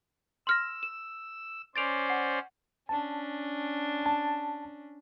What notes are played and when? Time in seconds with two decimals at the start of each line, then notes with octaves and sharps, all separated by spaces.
0.47 C6 E6 F6 A#6
0.83 E7
1.76 C#4 C5 D5 A6 D7 F7
2.10 F#5
2.89 C#4 D4 A5
4.06 A5